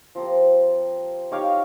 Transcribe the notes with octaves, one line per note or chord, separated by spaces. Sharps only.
F3 C4 G4 A#4
D#4 G4 C#5 F5